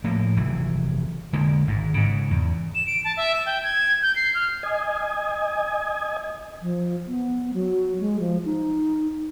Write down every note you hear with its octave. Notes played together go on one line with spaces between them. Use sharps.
A2 F3 A#3
F1 E3 F#3
D3 G#3 A#3
G#1 G#2
G#2 C#3
E2
E7
D7
A5
E5
E7
G5
G#6
G6
C7
F6
D#5 G#5
F3
B3
F#3
G#3
F3
D#4